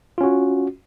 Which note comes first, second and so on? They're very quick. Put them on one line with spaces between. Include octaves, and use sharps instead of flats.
F4 C#4 F#4